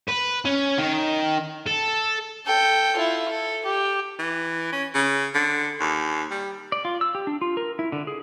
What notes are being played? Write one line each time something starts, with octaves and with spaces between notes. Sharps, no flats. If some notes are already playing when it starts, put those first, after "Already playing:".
B4
C#4
D#3
A4
A4 G5
E4 F4
A4
G4
E3
C#4
C#3
D3
D#2
G3
D5
F4
E6
G4
D4
F4
A#4
E4
D3
G#4